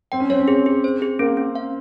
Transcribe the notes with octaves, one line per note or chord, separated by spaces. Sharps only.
C4 G5
C#4
C4 C#5
C#4
C4 G#4
G#4
C5
G#4
A#3 C#4
C#4
F5